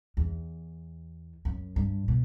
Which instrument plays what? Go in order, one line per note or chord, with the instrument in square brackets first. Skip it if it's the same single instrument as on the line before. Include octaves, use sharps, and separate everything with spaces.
[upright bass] E2
F#2
G2
B2